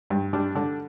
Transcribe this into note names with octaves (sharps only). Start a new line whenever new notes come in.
G2
G3 D4
D3 D4